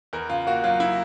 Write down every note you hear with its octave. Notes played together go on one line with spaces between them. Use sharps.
E2 A#4
C#3 F4
A#3 F#4
F#3 F4
E4